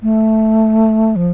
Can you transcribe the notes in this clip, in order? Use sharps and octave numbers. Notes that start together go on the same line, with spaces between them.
A3
F3